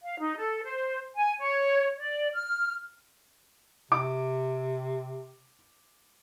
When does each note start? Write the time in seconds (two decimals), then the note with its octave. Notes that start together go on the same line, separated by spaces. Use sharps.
0.02 F5
0.19 D#4
0.38 A4
0.63 C5
1.15 G#5
1.39 C#5
1.98 D5
2.34 F6
3.92 C3 D6